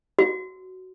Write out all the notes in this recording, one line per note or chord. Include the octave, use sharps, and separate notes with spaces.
F#4